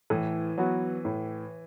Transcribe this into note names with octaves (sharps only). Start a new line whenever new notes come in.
A2 E3
F#3 B3 F#4
A2